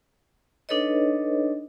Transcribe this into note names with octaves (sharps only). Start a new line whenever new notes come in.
D4 D#4 A4 B4 C#5 D#5